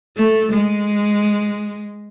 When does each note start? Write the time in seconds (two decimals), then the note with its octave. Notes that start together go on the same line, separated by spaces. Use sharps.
0.17 A3
0.53 G#3